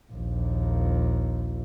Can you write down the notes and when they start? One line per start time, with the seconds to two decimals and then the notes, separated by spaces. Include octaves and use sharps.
0.12 A#1 D#2